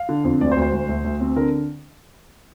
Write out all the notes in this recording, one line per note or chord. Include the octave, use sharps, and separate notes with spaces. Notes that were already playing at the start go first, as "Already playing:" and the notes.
Already playing: F5
D3
F2
D2 D5
C5
D2
C5
D2
D2
D2
C4
D3 A#4